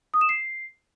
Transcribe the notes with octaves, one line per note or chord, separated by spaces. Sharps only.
D#6
E7
C7